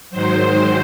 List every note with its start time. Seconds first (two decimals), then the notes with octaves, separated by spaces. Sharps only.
0.10 G#2 D#3 F#3 C5